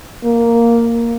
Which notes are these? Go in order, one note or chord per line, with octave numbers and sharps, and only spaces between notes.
A#3